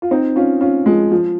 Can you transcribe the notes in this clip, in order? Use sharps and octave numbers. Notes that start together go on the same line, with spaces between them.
F4
C4 D#4
C#4 F4
C#4 F4
F3 G#3
F3